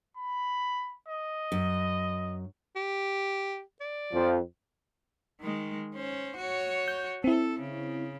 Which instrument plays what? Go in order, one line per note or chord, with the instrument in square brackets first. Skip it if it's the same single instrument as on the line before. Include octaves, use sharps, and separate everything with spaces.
[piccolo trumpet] B5
D#5
[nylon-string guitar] F#2
[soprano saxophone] G4
D5
[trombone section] F2 F3
[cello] D#3 G#3
C#4 C5
F#4 C#5
[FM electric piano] G6
[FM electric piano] C4 E4 [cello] A4
[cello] C#3